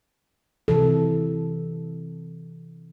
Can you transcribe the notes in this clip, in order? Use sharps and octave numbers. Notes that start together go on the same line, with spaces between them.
C3 E3 A4